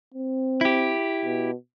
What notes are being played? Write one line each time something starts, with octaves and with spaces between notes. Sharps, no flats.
C4
E4 G4
B2